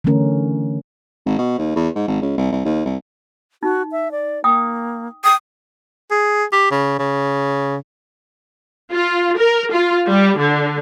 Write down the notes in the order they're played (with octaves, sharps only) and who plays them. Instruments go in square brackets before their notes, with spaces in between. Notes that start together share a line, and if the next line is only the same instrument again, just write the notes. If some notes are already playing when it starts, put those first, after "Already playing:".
[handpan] D3 E3 F#3 A3 C#4 A#4
[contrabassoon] G#1
B2
D#2
E2
G#2
G#1
C#2
C2
C2
D#2
C2
[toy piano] D#4 [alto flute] F#4
[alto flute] E5
D5
[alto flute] A#3 [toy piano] G5 D#6
[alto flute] G5 [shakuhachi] D#6
[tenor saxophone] G#4
G4
C#3
C#3
[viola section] F4
A#4
F4
G3
D3